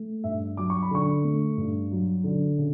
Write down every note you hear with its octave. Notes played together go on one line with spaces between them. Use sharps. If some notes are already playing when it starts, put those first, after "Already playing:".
Already playing: A3
G2 E5
F#3 D6
C#6
B5
D3 C#6
A3
G2
F#3
D3
C#3